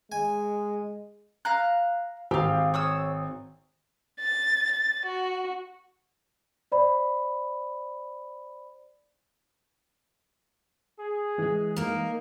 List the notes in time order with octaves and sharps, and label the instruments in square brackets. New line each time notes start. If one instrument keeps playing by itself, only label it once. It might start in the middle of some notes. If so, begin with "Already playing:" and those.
[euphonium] G#3 [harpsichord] G#5
[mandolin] F5 A#5 F#6
[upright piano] G#1 [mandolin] G4 F5
[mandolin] C#5 D#6 E6
[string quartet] A6
A6
F#4
[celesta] C5 D5 B5
[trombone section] G#4
[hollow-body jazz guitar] E3 G#3
[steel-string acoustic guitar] A#3 A#4 [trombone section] D#4